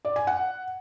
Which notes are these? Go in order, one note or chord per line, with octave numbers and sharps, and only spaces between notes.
D5
G#5
F#5